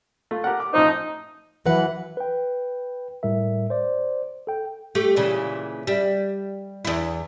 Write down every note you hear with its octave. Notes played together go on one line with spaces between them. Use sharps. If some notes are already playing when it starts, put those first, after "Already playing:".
A3 F4
G4 A#4 F#5
D6
A1 F3 D#4 C5
E3 F#3 B4 F#5
B4 G5
A2 G3 A#4 E5
C5 D5
A4 G5
A3 G4
A#2 C#3 E3
G3 E5
E2 E4